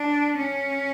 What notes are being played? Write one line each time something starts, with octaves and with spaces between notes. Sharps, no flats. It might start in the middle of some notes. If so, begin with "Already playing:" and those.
Already playing: D4
C#4